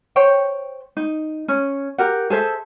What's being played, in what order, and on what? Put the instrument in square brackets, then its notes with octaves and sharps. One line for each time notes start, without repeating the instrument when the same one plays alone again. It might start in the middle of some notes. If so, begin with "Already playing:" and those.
[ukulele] C5 C#5 G5
D#4
C#4
G4 A#4 F#5
G#4 A4 C5 E5